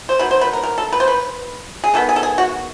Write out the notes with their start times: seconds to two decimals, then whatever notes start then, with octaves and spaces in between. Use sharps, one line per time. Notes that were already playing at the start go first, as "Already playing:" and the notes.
0.09 C5
0.19 D#3 F#3 A#3 B4
0.31 C5
0.41 B4
0.53 A#4
0.63 A#4
0.78 A4
0.93 B4
1.00 C5
1.08 B4
1.84 G#4
1.94 D#3 G#3 B3 A4
2.09 G#4
2.16 A4
2.23 G#4
2.38 F#4